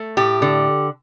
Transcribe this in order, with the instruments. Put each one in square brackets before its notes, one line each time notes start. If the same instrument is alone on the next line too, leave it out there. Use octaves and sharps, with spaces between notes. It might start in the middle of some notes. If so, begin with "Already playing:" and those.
Already playing: [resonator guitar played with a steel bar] A3
A2 G4
D3